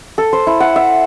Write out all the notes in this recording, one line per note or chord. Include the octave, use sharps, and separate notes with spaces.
A4
C5
E4
F#5
E5